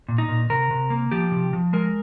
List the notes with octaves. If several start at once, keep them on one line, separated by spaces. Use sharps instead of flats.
A#2
D#4
A#2
C3 A#4
C3
A#3
F3 G4
C3
F3
G#3 A#4